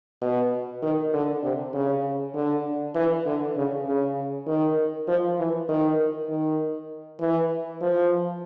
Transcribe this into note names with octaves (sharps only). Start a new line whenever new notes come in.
B2
D#3
D3
C3
C#3
D3
E3
D3
C#3
C#3
D#3
F3
E3
D#3
D#3
E3
F3